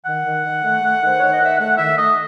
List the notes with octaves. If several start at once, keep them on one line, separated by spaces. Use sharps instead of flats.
D#3 F#5
D#3
D#3
A3
A3
D#3 C5
D#3 C#5
D#5
D#3
E5
A3 F#5
D#3 E5
A3 D#5